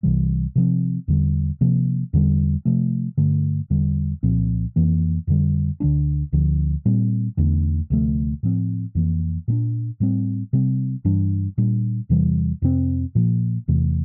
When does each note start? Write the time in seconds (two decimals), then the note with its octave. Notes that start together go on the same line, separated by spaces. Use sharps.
0.03 C2 C3 E3 G3
0.56 C3 F3 C4
1.08 E2 D3 G3
1.61 C3 F3 A#3
2.13 E2 D3 G3
2.65 C3 F3 A3
3.17 G2 D3 A3
3.70 E2 D3 G3
4.23 C2 A#2 F3 C4
4.76 F2 E3 A#3
5.27 F2 D3 G3
5.80 D2 D3 A3 D4
6.33 D2 D3 F3
6.85 A#2 G3 C4
7.37 E2 D3 A3 D4
7.90 D2 C3 F3 A3
8.43 A2 F3 C4
8.95 F2 E3 A#3
9.48 A#2 A3 D4
10.00 A2 G3 C4
10.53 C3 G3 C4
11.05 G2 E3 G3 D4
11.58 A#2 G3 D4
12.09 E2 C3 E3 G3
12.62 F2 C3 G3 C4
13.15 A#2 F3 A#3
13.68 E2 C3 E3 A3